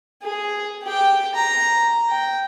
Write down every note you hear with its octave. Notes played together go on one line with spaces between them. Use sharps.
G#4
G4 G5
A#5
G5